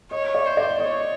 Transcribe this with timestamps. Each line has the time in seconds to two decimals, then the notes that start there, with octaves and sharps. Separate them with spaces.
0.11 C#5 D#5
0.35 D5
0.46 C5
0.57 D5
0.80 C#5 D#5